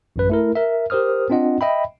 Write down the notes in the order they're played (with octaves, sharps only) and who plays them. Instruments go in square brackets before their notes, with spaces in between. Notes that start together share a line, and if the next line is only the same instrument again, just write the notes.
[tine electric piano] A1 F#2 B4
A3 E4 A#4
A#4 E5
G4 A#4 C5 D#6 F6
C4 D4 F4 D#5 F#5
D#5 E5 G5 B5